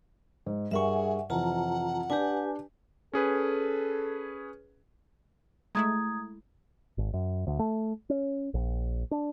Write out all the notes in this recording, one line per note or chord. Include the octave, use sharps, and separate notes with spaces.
G#2
G2 G#4 A#4 E5 F#5 G#5 C#6
F2 C3 E3 F4 F#5 A5 A#5
D4 G4 B4 D5 G#5
C#4 G#4 A4 B4
G#3 A3 E4 A#5 D#6 G#6
G#1
F#2
D2
A3
C#4
A#1
D4